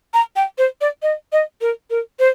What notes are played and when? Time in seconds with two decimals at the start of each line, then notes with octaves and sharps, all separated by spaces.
0.14 A#5
0.36 G5
0.58 C5
0.81 D5
1.02 D#5
1.32 D#5
1.61 A#4
1.90 A#4
2.19 C5